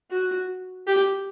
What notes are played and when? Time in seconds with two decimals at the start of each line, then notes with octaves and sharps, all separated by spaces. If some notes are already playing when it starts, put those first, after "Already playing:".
0.10 F#4
0.87 G4